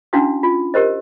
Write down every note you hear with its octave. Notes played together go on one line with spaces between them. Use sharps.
C#4 D4 E4 F#4 F5 D#6
F4
G4 A#4 C5 D#5